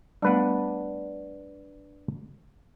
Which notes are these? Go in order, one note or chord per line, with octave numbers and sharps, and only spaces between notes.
G3 A3 B3 D4 B4 F#5